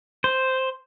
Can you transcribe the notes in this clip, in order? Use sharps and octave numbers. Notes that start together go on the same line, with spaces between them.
C5